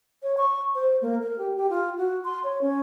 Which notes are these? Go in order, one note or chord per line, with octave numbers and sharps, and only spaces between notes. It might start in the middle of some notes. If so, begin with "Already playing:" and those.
C#5
C#6
C5
A#3
A#4
G4
G4
F4
F#4
C6
C#5
C#4